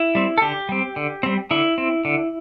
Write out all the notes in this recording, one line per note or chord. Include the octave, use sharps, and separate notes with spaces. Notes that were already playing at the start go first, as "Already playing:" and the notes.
Already playing: E4
G3 C4
A4
D3 G4
G3 C4
D3
G3 C4
D3 E4
C4
D3